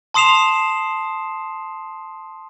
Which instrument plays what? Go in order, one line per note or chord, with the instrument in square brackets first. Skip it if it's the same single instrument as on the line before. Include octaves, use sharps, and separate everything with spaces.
[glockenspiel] A5 C6 D#6 C7 E7 F7